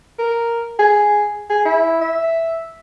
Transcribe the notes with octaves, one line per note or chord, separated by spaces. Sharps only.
A#4
G#4
G#4
E4
E5